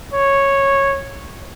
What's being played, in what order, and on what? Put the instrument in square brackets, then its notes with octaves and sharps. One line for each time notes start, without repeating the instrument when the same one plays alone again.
[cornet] C#5